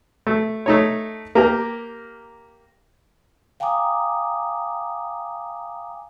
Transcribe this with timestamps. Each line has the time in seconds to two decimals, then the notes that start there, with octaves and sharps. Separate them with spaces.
0.27 A3
0.66 A3 D#4 C#5
1.35 A#3 G4 A#4
3.60 F5 G5 G#5 A#5 D6 D#6